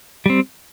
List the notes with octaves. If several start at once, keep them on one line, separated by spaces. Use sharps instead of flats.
G3 C4